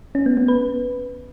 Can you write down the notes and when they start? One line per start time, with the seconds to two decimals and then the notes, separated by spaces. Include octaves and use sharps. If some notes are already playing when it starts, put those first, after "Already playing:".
0.15 C#4
0.26 B3
0.37 B3
0.48 B4